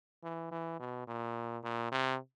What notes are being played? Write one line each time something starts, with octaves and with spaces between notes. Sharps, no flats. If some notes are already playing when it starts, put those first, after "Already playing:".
E3
E3
B2
A#2
A#2
C3